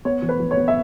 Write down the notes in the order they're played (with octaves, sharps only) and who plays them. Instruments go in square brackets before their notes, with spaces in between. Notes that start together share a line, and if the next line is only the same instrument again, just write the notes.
[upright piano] B3 C#5
E3
B4
E3
C#5
B3
E5